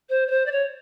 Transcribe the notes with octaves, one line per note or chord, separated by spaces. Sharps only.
C5
C#5
C5
D5
C#5